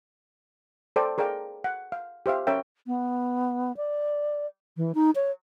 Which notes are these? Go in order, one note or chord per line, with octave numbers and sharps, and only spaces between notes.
A4 C5 D5 G5
G#4 A#4 D5 F5 G5
F#5
F5
G4 C5 E5 F5
C#4 A#4 C#5 E5 G5
B3
D5
E3
D#4
C#5